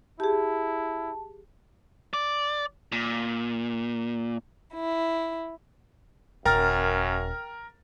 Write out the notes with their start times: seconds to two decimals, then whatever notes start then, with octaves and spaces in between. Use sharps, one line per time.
0.20 E4 G4 G#4 A5
2.13 D5
2.92 A#2
4.75 E4
6.46 D#1 F#2 A#4 G5 A#5 F6 A6